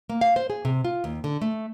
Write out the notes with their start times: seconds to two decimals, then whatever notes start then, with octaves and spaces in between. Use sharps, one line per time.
0.09 A#3
0.21 F5
0.36 C5
0.50 G#4
0.65 C3
0.85 F4
1.04 D#2
1.24 D3
1.42 A3